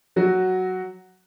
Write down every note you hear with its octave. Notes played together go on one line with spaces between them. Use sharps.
F#3 F#4